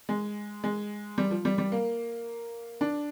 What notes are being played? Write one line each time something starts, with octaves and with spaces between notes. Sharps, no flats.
G#3
G#3
G3
F3
G3
G3
A#3
D4